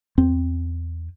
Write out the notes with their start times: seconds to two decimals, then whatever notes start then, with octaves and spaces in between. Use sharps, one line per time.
0.18 E2 C4